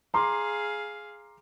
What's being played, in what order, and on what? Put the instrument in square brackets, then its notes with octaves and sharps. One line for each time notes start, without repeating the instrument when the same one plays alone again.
[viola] G#4 F5 [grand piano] A#5 C6 D6